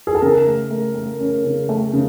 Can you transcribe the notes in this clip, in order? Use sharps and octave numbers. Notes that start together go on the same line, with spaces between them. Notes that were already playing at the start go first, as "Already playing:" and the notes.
G#4
A4
C#3 A#4
A3
A3
A3
C#4
C#3
A3
C#3